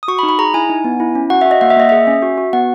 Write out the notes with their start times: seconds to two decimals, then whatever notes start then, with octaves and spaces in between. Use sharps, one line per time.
0.03 D#6
0.08 F#4 C#6
0.19 B5
0.23 D#4
0.29 B5
0.39 G#4 A#5
0.54 E4 G#5
0.69 D#4
0.84 B3
1.00 E4
1.15 C#4
1.30 F#4 F#5
1.41 F#4 E5
1.51 D#5
1.61 A#3 F#5
1.70 E5
1.77 A#3 D#5
1.89 G#4 E5
2.07 C#4
2.22 F#4
2.38 F#4
2.53 B3 F#5